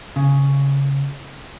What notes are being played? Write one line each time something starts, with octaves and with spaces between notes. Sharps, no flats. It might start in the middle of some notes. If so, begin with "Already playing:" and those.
C#3